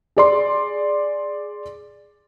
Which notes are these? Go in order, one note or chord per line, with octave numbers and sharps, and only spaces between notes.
G#4 D5 C6